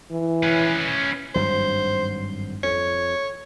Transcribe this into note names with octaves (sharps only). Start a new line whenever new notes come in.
E3
C#4 B4
G#1 G2 F#3 C5
F2 C#5